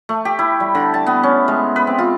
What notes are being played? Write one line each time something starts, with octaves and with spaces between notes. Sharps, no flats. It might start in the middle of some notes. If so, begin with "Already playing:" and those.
A3
G4
E4
G3
D3
A5
B3
C#4
G#3
B4
C4
F4